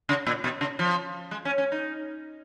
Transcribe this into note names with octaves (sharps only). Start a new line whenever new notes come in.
C#3
A#2
B2
C#3
F3
G#3
C#4
C#4
D#4